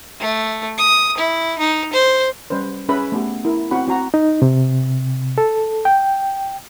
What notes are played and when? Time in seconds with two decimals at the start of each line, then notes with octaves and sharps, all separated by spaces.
0.20 A3
0.78 D#6
1.17 E4
1.58 D#4
1.93 C5
2.50 G3 C#4 B4 C5
2.89 C#4 G#4 B4 E5 B5
3.12 A3 B3 G4
3.45 E4 A#4
3.71 C4 F#4 F#5 B5
3.88 C4 F#4 A#5
4.14 D#4
4.42 C3
5.38 A4
5.85 G5